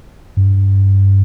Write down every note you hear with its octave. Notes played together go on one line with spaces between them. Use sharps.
G2